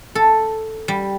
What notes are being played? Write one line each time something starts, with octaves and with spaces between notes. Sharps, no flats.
A4
G3